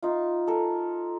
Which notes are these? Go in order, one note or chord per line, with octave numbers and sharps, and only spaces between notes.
D#4 F4
A4 A#4